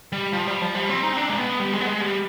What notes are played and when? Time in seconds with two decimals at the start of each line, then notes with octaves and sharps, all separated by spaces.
0.12 G3
0.33 F3
0.47 G3
0.61 F3
0.75 G3
0.89 C4
1.03 D#4
1.13 C4
1.17 D4
1.29 G#3
1.38 B3
1.59 G3
1.73 G#3
1.81 B3
1.87 G#3
2.01 G3